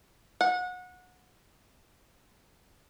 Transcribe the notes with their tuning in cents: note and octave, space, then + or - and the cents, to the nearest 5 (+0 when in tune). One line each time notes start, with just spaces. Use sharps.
F#5 -25